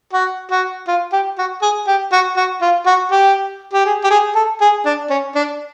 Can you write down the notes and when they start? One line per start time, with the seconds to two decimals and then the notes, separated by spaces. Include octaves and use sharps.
0.13 F#4
0.51 F#4
0.88 F4
1.12 G4
1.38 F#4
1.62 G#4
1.87 G4
2.12 F#4
2.37 F#4
2.62 F4
2.86 F#4
3.11 G4
3.74 G4
3.86 G#4
4.04 G4
4.11 G#4
4.35 A4
4.61 G#4
4.85 D4
5.10 C#4
5.35 D4